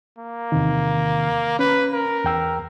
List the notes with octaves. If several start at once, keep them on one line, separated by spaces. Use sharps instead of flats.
A#3
E2 C3 D#3
C#4 B4
A#4
E2 G5 E6